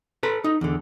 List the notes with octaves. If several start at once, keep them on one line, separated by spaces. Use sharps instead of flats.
A4 B4 A#5 B5
D#4
E2 D3